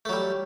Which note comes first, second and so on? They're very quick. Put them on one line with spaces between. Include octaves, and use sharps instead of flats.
A3 F#3 G3